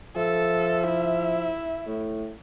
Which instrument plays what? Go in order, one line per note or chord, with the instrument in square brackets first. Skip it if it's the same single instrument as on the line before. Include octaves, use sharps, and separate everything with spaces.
[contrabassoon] F3 [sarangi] A4 [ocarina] E5
[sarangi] E4
[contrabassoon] A2